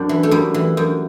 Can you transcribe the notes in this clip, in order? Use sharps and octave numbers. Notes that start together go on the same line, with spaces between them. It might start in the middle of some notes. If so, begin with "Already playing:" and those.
Already playing: F#2 C4 D4
E3
A3
F#2 G3
E3
F#2